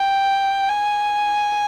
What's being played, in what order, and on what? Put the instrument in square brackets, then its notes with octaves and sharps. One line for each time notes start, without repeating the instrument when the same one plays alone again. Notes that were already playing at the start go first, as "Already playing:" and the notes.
Already playing: [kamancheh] G5
G#5